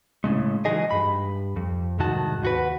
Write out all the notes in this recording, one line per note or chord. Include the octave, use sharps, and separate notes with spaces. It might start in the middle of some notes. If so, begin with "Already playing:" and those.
A2 C#3 G#3
E3 F#3 G#3 D#4 G#4 D#5
G2 B5
F2
C2 G#2 D#3 F#4 A5
D#2 F#4 B4